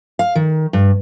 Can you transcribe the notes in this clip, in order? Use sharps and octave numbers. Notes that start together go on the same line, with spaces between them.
F5
D#3
G2